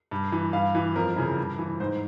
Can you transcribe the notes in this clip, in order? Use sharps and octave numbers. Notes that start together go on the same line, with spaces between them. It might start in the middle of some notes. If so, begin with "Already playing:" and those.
G2
E3
G2 F5
E3
F2 A#4
C#3 E3
G2
E3
G#2 C5